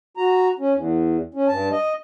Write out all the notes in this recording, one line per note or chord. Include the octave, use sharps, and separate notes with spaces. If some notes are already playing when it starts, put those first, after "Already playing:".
F#4 A#5
C#4
E2
C#4
G2 A5
D#5